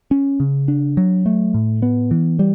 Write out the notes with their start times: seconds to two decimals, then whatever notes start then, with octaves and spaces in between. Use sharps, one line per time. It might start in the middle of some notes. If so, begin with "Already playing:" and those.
0.11 C#4
0.40 C#3
0.68 D4
0.97 F#3
1.26 A3
1.54 A2
1.82 B3
2.11 E3
2.39 G3